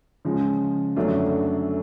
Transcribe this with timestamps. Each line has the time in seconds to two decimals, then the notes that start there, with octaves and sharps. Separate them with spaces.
0.25 C#3 F3 G#3
0.96 F#2 D3 F#3 A3 D4